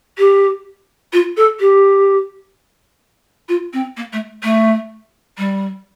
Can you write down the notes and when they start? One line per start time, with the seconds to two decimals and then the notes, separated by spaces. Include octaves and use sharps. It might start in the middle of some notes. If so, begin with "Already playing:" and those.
0.18 G4
1.13 F4
1.37 A4
1.60 G4
3.49 F4
3.73 C4
3.97 A#3
4.12 A3
4.43 A3
5.38 G3